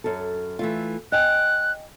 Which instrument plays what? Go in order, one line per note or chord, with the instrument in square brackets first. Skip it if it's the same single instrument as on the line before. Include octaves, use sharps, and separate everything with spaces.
[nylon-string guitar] F#2 A4
E3 A3 F4
[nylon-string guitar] D#5 G5 G#5 [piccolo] F#6